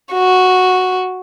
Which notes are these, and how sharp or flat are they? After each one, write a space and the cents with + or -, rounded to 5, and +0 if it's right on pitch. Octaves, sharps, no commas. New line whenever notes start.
F#4 -5